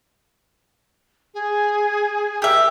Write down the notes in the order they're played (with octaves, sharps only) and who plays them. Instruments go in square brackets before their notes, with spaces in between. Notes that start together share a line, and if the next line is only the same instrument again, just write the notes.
[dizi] G#4
[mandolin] G4 E5 [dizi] A#4